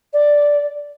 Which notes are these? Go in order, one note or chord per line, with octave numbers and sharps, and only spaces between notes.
D5